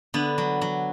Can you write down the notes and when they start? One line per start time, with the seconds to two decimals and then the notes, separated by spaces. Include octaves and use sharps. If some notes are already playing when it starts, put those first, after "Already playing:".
0.14 D3 B3
0.38 F#3
0.61 F#3